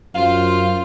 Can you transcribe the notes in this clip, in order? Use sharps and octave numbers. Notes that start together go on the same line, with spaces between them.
F#2 F4 C5 F5